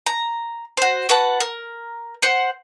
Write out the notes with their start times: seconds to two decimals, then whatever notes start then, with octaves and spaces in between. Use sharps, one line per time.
0.06 A#5
0.77 F#4 C5
1.09 F#4 B4 F#5 A5
1.40 A#4
2.22 C5 F#5